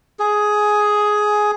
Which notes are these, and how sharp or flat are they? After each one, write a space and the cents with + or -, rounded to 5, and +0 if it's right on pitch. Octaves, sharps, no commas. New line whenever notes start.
G#4 +10